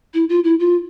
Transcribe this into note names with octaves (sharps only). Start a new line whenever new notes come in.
E4
F4
E4
F4